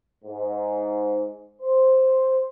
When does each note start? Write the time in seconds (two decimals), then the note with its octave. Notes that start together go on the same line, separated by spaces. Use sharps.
0.23 G#2
1.60 C5